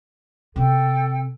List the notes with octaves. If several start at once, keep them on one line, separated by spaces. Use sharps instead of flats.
C3 A4 G5